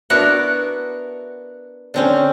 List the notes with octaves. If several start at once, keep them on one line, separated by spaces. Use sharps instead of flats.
B3 D4 E4 F#4 A#4 F#5
D3 C4 C#4